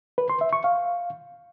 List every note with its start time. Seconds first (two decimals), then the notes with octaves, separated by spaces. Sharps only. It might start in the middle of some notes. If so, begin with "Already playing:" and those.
0.18 B4
0.30 C6
0.41 E5
0.53 C#6
0.64 F5